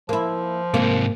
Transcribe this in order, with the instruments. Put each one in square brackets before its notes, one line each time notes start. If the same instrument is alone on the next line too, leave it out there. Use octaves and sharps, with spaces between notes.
[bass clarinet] F3 [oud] A#3 E4
[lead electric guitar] G#2 C3 [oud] A#3